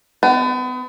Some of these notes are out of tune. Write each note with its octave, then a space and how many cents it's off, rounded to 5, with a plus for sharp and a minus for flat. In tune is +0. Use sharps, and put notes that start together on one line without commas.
B3 +35